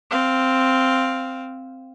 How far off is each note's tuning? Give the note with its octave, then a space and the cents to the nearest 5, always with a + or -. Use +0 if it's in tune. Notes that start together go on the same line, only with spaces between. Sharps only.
C4 +0 F5 +0